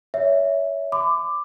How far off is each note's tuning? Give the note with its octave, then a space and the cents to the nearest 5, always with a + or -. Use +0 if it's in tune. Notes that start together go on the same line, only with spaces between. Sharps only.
C#5 +25 E5 -5
B5 +40 D6 +10